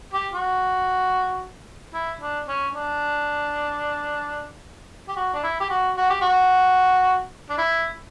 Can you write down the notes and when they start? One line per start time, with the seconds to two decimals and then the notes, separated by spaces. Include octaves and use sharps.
0.14 G4
0.33 F#4
1.94 E4
2.21 D4
2.48 C#4
2.75 D4
5.08 G4
5.16 F#4
5.34 D4
5.43 E4
5.60 G4
5.70 F#4
5.97 F#4
6.10 G4
6.22 F#4
7.50 D4
7.58 E4